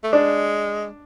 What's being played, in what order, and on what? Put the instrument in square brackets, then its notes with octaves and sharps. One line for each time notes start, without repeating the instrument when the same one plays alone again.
[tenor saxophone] A3
[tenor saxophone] G#3 [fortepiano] D4